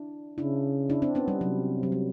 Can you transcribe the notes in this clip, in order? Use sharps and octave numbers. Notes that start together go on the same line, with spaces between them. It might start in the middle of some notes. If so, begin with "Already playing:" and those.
Already playing: D4 E4
C#3 D4 E4
D4 E4
C4 D4
B3 C#4
G3
C3 F#3
F#3
G3